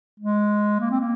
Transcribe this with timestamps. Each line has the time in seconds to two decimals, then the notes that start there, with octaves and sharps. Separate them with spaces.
0.20 G#3
0.80 A#3
0.91 C4
1.00 A#3